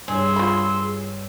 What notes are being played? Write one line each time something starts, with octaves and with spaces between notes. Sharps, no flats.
G2 G#4 C#5 C6 E6
F4 B5